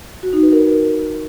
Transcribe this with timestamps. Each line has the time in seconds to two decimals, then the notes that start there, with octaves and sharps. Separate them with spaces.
0.23 F#4
0.33 D#4
0.43 B4
0.53 A#4